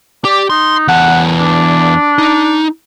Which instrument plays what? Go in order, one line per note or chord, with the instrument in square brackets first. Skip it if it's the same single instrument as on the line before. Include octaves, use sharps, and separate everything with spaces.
[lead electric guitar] G4 [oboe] D5
[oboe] D#4 [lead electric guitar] C6
[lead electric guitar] E2 A5 [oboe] F#5
[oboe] D4
[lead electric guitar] D#4